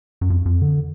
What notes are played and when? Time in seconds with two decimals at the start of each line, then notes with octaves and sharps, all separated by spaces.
0.21 F#2
0.30 F2
0.46 F2
0.62 D3